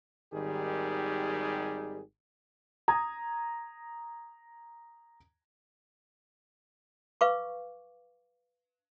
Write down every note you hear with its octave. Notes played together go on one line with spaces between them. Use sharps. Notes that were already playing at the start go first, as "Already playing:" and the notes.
G#1 D#3 G3 G4 G#4
A#5 D#6 G#6
B4 F5 C#6 D6